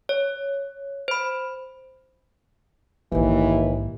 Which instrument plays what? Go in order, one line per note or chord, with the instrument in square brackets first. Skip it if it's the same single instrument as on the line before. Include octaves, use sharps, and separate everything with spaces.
[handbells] C#5
C5 B5
[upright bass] A#1 G#2 [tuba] D#2 [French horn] E3